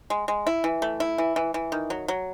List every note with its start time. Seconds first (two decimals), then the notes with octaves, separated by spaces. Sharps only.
0.10 G#3
0.28 G#3
0.47 E4
0.64 E3
0.82 A3
1.00 E4
1.18 E3
1.36 E3
1.54 E3
1.72 D#3
1.90 F#3
2.08 F#3